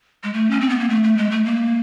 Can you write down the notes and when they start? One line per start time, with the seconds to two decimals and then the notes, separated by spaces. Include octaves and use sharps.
0.23 G#3
0.33 A3
0.51 C#4
0.60 C4
0.70 B3
0.80 A#3
0.89 A3
1.03 A3
1.17 G#3
1.31 A3
1.45 A#3